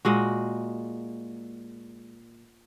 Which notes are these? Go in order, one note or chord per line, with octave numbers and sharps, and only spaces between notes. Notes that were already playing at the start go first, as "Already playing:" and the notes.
A#2 G#3 F#4